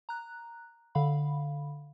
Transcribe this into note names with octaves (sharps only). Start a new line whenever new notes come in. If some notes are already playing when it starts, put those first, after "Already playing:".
A#5 F#6
D3 F5 B5